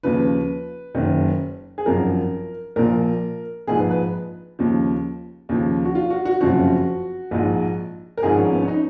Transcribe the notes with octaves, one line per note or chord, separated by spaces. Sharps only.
D#2 C#3 F3 B4
F#1 F#2 D#3
G#4
G#1 F#2 F3 A#4
A#1 A#2 F3 A#4
A#1 G#2 F3 G#4
B4
B4
D#2 C#3 F3
D#2 C#3 F3
F#4
F4
F#4
F#4
F#1 F2 C#3 F3 F#4
A#1 G#2 F3
A#4
G#1 G#2 F3 G#4
C#4
B3
C#4
D#4